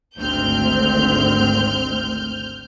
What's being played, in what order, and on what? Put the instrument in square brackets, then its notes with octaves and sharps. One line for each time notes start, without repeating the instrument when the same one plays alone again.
[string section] G#1 D2 C4 [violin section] F6 G6